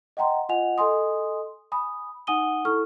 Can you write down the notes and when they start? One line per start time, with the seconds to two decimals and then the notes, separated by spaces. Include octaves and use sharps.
0.17 D#5 F#5 G5 A#5 C6
0.49 F4 D#5 F#5 G#5 F7
0.78 A4 D#5 G#5 C6 D#6
1.72 G#5 B5 D#6
2.27 D#4 F#5 G#5 D#6 D#7 G7
2.65 E4 A4 C#6 F6